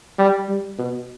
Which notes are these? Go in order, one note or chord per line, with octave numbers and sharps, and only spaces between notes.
G3
G3
B2